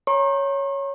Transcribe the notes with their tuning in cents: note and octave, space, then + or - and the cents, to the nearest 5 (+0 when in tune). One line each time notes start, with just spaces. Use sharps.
C#5 +0 A#5 +0 C#6 -45